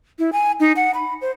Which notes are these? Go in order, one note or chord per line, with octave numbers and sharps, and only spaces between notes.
E4
G#5
D#4
F#5
B5
C5